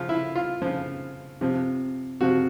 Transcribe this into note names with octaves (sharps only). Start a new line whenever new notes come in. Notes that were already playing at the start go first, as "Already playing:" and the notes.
Already playing: C#3 F3 F4
E4
F4
C#3 F3
C3 F3
C3 F3 F#4